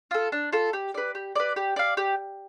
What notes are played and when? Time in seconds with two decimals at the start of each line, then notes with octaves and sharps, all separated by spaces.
0.11 F4 A4
0.32 D4
0.52 F4 A4
0.73 G4
0.94 B4 D5
1.15 G4
1.35 B4 D5
1.56 G4
1.76 D5 F5
1.97 G4